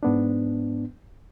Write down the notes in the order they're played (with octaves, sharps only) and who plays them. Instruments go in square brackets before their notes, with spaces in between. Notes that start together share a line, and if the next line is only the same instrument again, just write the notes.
[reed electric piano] G#2 B3 D4